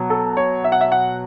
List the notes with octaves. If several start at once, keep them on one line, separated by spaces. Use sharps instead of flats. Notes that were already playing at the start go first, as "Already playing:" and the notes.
Already playing: B2 F#3
A4
C#5
E5
F#5
E5
F#5